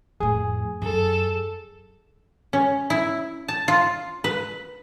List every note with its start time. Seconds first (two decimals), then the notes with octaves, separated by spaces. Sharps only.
0.20 F2 A2 G#4
0.82 F#2 A4
2.53 C#4
2.90 E4
3.48 A5
3.68 F4
4.24 B4